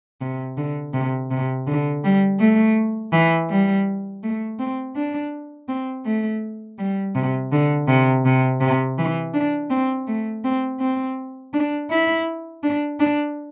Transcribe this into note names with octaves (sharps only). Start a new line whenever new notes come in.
C3
D3
C3
C3
D3
G3
A3
E3
G3
A3
C4
D4
C4
A3
G3
C3
D3
C3
C3
C3
E3
D4
C4
A3
C4
C4
D4
E4
D4
D4